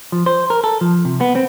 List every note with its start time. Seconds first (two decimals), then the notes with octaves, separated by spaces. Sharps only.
0.12 F3
0.26 C5
0.50 A#4
0.64 A4
0.81 F3
1.05 C3
1.21 B3
1.35 C4